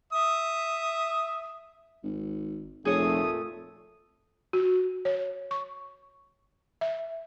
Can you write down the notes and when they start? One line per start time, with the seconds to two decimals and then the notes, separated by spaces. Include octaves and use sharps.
0.13 E5 D#6
2.03 G#1
2.85 F1 A#2 A3 G#4 C#5 D#6
4.53 F#4
5.05 C#5
5.51 C#6
6.81 E5